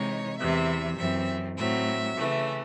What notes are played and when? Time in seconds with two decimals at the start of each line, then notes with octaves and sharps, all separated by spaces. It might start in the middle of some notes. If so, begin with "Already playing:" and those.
Already playing: C3 E3 G#3 D#4 C#5
0.38 E2 C3 E3 E5
0.98 F#2 E3 C4 E5
1.58 A2 F#3 C4 E5
2.17 C#3 E3 A3